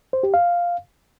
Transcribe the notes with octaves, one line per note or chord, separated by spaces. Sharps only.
C5
G4
F5